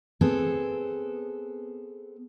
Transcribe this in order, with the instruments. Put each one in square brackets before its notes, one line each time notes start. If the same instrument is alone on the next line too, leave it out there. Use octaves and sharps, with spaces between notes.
[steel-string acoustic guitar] B3 C4 G#4 A4